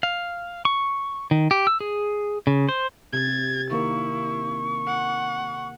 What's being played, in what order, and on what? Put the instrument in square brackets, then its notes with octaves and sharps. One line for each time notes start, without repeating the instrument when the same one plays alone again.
[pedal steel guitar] F5
C#6
D#3
G4
E6
G#4
C#3
C5
[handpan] C3 [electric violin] G#6 A6
[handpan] D#3 A#3 A#4 [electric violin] E4 [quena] C#6
[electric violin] F#5